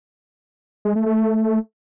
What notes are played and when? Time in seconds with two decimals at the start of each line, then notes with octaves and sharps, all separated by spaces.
0.85 G#3
0.95 A3
1.06 A3